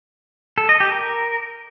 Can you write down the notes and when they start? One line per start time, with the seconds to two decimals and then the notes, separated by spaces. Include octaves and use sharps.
0.58 A4
0.69 D#5
0.80 G4
0.92 A#4